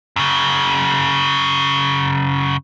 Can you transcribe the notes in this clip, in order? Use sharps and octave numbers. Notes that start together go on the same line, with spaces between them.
F#2 C#3